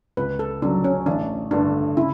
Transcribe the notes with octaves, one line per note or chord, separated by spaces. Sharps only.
C#2 B4
A4
C#3 F#3 D4
C#4
A1 D4
G2 D3 A3 D4
C#3 E4